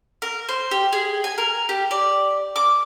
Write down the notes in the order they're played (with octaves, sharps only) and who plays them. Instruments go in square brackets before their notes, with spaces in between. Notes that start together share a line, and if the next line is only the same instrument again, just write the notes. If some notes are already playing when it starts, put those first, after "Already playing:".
[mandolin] A#4
C5
G4
G#4
G#5
A#4
G4
D5
D6